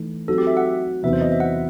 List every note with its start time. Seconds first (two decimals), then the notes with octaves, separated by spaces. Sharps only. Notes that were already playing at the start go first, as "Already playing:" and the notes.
Already playing: E3 A3 D#4
0.28 F#3 C4 D#4 F#4 A4
0.38 G4
0.47 E5
0.57 F#5
1.03 E2 C3 F#3 B3 D#4 E5
1.13 C5
1.21 D#5
1.32 E5
1.40 F#5